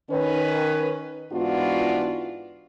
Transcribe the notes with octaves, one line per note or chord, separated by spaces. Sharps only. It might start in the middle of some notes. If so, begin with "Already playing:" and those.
D#3 C#4 B4
G#2 E3 B3 D4 F4 F#4